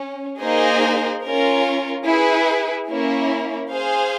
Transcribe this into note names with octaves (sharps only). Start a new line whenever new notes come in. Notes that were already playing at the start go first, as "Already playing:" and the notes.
Already playing: C#4
A#3 D#4 G#4 C5 D#5
C#4 F4 A#4
E4 G#4 B4
A#3 C#4 E4
G#4 C5 F5